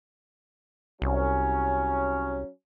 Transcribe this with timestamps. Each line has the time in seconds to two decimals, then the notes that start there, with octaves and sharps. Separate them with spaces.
1.02 C2 F#3 C#4